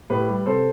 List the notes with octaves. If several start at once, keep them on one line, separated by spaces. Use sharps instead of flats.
A2 G4 B4
G3
C3 A4 C5